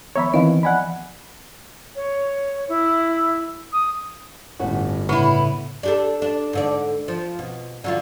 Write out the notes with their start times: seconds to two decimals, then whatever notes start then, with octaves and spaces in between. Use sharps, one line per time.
0.16 D#3 F3 B3 C#5 E5 B5
0.34 D#3 E3 C4 D#5 F5 B5
0.63 F3 D5 D#5 F#5 G#5 B5
1.96 C#5
2.69 E4
3.73 D#6
4.60 G1 A2 C#4 F#4
5.09 A2 C#3 A3 B3 E4
5.83 D4 G4 A4
6.22 D4
6.53 G#2 D3 D5
7.08 F3
7.39 B2
7.84 D3 F#3 F4